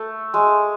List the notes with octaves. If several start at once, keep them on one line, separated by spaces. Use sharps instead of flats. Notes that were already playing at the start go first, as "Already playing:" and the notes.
Already playing: A3
G#3